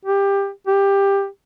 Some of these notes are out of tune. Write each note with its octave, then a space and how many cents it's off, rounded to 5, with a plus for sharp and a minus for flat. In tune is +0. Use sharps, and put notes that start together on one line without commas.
G4 +20
G4 +15